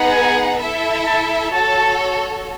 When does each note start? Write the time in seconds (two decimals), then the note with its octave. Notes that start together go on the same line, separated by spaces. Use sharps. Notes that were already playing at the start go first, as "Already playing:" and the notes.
Already playing: B3 D#4 G#4 B4 F#5
0.12 G#5
0.59 E4 A4 E5
1.06 A5
1.52 F#4 A4 C#5 A5